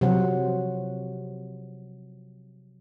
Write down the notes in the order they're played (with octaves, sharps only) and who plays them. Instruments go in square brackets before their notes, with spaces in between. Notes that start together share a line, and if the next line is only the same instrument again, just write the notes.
[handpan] C3 F3 F#3 C5 F#5